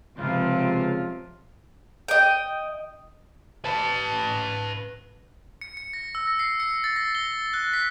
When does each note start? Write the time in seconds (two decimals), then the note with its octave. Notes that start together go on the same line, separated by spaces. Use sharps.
0.18 C#2 C3 F3 F4
2.08 D#5 G5
3.65 B4 A5
5.61 C#7
5.77 C#7
5.93 A#6
6.15 E6
6.27 A#6
6.39 C7
6.60 C#7
6.84 A6
6.96 A#6
7.15 G7
7.53 F#6
7.73 B6